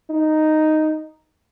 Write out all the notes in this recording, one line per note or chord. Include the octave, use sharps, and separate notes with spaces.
D#4